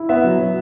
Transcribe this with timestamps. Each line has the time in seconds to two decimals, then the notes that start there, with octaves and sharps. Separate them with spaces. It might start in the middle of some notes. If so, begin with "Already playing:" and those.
Already playing: E4
0.09 B3 E5
0.24 F#3
0.39 F#3